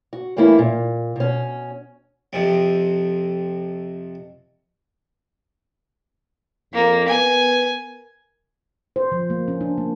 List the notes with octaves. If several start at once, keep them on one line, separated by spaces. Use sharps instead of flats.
F#4
G2 E3 A3 A#3 C#4 E4
A#2
B2 C#4
F2 C3
F2 A#3
B3 G#5
C5
F3
A#3
C#4
D4
A#3